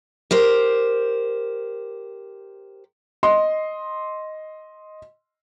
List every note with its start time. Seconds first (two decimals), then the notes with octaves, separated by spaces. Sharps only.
0.31 G4 A#4 C5
3.23 D#5 C6